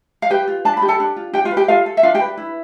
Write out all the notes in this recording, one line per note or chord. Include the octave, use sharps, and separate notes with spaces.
F5
G4 B4 G5
F4
D4 A5
B5
G4
A4 A5
D4
F4
D4 G4 G5
F4 F5
B4
G4 G5
F4 A4 F5
A4
E5
D4 F4 F5
G4 G5
B4
E4